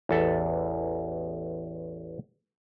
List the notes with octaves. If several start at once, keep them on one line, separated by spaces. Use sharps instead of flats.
A1 E2 A4 E5